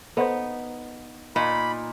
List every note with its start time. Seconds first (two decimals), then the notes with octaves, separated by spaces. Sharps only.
0.17 B3 D#4 A4 B4 C5
1.36 A#2 D#4 B5